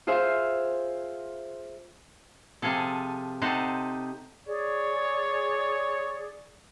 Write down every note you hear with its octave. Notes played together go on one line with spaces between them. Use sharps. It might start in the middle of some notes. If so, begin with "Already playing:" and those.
F4 G#4 C5 E5 F5
C3 F3 G#4 A4
C3 D#4 A4 C5 F#5
G#4 C#5 D5